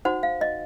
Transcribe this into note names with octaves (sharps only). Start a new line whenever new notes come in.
D#4 F#4 C5 F#5
F5
D#5